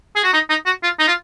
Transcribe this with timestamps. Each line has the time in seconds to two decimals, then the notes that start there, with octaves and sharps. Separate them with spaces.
0.16 G#4
0.24 F#4
0.34 D#4
0.50 D#4
0.66 F#4
0.83 F4
1.00 D#4
1.08 F4